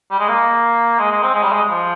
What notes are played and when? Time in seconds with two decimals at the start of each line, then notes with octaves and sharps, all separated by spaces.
0.11 G3
0.19 G#3
0.28 A#3
0.99 G#3
1.11 G#3
1.23 C4
1.35 G#3
1.43 G3
1.52 G#3
1.70 F3